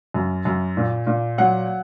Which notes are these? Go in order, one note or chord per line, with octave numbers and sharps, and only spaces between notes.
F#2
F#2
A#2
A#2
F#3 F#5